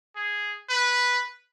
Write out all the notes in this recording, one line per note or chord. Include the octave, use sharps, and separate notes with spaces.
G#4
B4